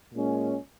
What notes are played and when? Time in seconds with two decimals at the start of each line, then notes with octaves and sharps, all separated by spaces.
0.14 A#2 G#3 C#4